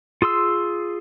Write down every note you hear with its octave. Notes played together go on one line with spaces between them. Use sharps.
F4 G#4 C6 E6